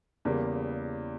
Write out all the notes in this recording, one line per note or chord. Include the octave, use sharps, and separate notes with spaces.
E2 C#3 G3 A#3